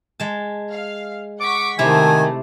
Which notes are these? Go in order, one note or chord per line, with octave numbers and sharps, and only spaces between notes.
G#3 A5
F5
F#5 C#6 D6 B6
C3 D#3 A3 D#4 E4 G#5